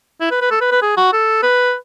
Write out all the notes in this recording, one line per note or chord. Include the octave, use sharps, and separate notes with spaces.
E4
B4
B4
A4
B4
B4
G#4
F#4
A4
B4